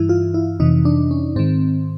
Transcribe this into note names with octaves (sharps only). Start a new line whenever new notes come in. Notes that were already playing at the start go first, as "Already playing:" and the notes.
Already playing: G2 E3 E4
F4
E4
F2 C3 E3 D#4
D4
C#4
G#2 D#3 C4